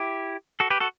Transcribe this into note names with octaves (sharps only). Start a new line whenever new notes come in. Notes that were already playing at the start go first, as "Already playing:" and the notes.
Already playing: E4 G4
F#4 A4
G4 B4
F#4 A4